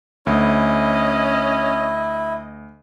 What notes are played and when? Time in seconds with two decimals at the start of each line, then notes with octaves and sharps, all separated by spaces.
0.26 D2 C#4 E4 D#5